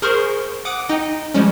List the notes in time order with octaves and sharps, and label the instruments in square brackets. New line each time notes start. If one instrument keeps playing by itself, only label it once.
[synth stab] G#4 A#4 C5 C6 C#6 F6
F#5 D6 D#6 D7
D#4 D#5 G5
F3 G3 G#3 C#4